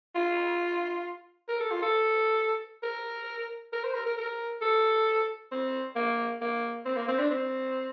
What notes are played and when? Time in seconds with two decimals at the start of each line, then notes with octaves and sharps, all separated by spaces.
0.15 F4
1.48 A#4
1.60 A4
1.71 F4
1.82 A4
2.83 A#4
3.73 A#4
3.84 C5
3.94 A#4
4.06 A#4
4.17 A#4
4.62 A4
5.52 C4
5.96 A#3
6.41 A#3
6.85 C4
6.96 A#3
7.08 C4
7.19 D4
7.30 C4